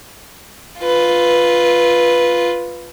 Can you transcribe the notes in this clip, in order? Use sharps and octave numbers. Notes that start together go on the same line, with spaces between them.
F4 B4